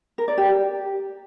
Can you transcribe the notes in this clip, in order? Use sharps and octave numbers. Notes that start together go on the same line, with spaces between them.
A#4
D5
G4